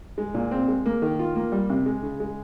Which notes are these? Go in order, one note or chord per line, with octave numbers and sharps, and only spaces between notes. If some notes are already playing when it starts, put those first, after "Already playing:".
G#3
A#2
C4
G#3
A#3
D#3
F4
A#3
G3
C3
G#3
C#3
G#3